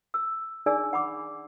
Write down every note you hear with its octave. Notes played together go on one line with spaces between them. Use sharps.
E6
D4 D#4 G#4 D5 G#5 E6
F#5 B5 D6